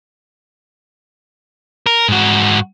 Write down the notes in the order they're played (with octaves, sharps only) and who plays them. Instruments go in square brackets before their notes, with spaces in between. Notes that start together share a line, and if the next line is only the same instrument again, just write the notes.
[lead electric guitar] A#4
G#2 F#4